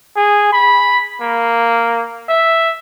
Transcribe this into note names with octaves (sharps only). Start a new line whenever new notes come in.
G#4
B5
A#3
E5